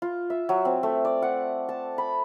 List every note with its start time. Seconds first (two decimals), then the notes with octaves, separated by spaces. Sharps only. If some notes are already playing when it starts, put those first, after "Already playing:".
0.02 F4
0.30 E5
0.49 F#3
0.65 C4
0.83 A3
1.05 D5
1.22 F#5
1.69 A5
1.98 B5